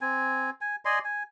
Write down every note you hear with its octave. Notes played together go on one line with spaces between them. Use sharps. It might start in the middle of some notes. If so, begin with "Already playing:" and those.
C4 G#5
G#5
D5 D#5 G#5 C6
G#5